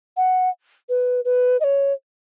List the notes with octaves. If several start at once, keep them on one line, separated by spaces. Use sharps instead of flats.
F#5
B4
B4
D#5
C#5